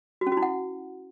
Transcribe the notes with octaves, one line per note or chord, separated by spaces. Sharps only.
F#4
C#4
F#4
E4
F#5